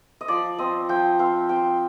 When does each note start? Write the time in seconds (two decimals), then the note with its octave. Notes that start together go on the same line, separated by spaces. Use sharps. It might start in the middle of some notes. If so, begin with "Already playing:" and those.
0.21 D#5
0.28 F3 D5
0.58 C4 D#5
0.89 F3 G5
1.19 C4 F5
1.49 C4 G5